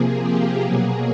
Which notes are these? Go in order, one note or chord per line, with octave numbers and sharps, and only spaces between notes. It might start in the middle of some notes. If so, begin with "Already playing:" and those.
Already playing: C3 F3 A#3 G#4
G4
B2 F#3 A#3 G#4